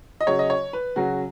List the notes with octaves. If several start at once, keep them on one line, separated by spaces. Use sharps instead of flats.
D#5
C#3 F#3 C#5
D#5
C#5
B4
C#3 F#3 F#4